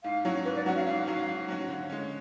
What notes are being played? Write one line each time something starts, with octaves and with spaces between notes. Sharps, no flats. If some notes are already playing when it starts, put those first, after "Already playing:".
G#2 F5
F#3 C#4 F#4
G#2 B4
D5
F#3 C#4 F#4 F#5
F5
G#2 F5
F#3 C#4 F#4
G#2
F#3 C#4 F#4
D3
G#3 C#4